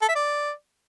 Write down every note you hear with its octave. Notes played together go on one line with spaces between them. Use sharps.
A4
E5
D5